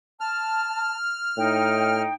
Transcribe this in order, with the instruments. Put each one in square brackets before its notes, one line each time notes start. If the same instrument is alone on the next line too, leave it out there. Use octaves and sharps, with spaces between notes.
[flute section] A5 [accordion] F6
[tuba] A2 [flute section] D#4 G5